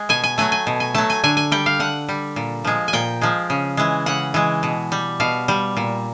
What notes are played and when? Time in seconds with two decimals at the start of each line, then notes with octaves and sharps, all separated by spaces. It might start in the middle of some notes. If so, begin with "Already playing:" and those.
Already playing: G#3
0.09 B2 G#5
0.24 G#5
0.38 F#3 A3 G#5
0.52 G#5
0.67 B2
0.80 G#5
0.94 F#3 A3 A5
1.10 G#5
1.24 D3 G#5
1.37 G#5
1.52 G3 G5
1.66 F5
1.80 D3 F#5
2.09 G3
2.36 A#2
2.65 F3 G#3
2.88 G#5
2.93 A#2 G5
3.21 F3 G#3
3.50 C#3
3.77 E3 G#3
4.06 C#3 F#5
4.34 E3 G#3
4.63 B2
4.92 G3
5.20 B2 F5
5.48 G3
5.77 A#2